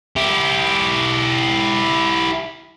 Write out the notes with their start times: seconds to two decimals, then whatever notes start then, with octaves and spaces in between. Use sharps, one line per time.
0.16 E4 G4